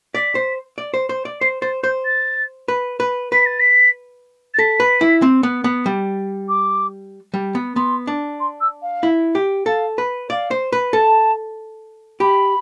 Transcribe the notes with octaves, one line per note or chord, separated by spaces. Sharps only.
D5 B6
C5
D5
C5
C5
D5
C5 C7
C5 A6
C5 G6
A6
B4
B4
B4 B6
A6
B6
A6
A4 B6
B4
E4
C4
B3
B3
G3
D6
G3
B3
B3 C6
D4
C6
E6
F5
E4
G4
A4 F5
B4
D5 F5
C5
B4
A4 A5
G4 B5